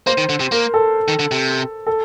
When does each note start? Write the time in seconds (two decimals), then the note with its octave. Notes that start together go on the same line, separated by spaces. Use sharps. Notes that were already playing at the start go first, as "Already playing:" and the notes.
0.07 A#3 C5
0.18 D#3
0.29 D3
0.40 C3
0.52 A#3 A#4
0.74 A4
1.08 D#3
1.19 D3
1.31 C3
1.87 A4